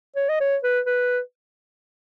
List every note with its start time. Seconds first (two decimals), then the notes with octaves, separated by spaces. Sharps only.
0.16 C#5
0.29 D#5
0.40 C#5
0.63 B4
0.86 B4